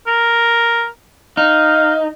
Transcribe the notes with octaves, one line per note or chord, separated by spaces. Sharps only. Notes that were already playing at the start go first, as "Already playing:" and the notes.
A#4
D#4 F5